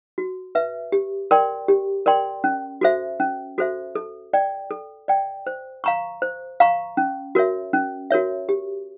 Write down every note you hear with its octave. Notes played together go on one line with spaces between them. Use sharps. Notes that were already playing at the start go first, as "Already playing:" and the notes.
F#4
B4 E5
G4
A#4 D5 G5 C6
G4
A#4 D5 G5 C6
C#4
F#4 A4 C5 E5
C#4
F#4 A4 C5 E5
A4
D5 G5
A4
D5 G5
C5
F5 A#5 C#6
C5
F5 A#5 C#6
C#4
F#4 A#4 C#5 E5
C#4
F#4 A#4 C#5 E5
G4